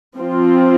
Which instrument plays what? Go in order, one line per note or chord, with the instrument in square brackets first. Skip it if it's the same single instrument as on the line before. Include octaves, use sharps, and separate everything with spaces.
[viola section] F3 C4 F4